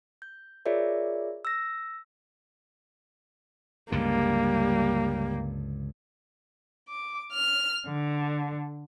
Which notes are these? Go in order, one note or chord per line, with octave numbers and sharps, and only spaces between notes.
G6
F4 G#4 A#4 C#5 D5 E5
E6 A#6
C#2 G2 D3 G3 A#3
D6
F6
D3